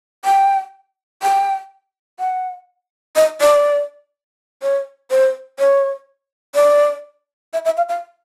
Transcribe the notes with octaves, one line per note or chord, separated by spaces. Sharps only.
G5
G5
F#5
D#5
D5
C#5
C5
C#5
D5
E5
E5
F5
F5